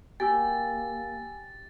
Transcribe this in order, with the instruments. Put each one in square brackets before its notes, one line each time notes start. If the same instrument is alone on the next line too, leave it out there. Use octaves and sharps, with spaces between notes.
[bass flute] A#3 [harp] G4 [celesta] G#5 E6 [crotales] A6